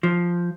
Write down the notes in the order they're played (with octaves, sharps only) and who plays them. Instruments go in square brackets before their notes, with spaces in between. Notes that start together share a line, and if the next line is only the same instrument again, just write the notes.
[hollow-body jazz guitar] F3